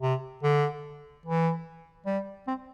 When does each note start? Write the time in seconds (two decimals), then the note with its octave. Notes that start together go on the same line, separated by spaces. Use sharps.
0.02 C3
0.43 D3
1.26 E3
2.06 G3
2.47 C4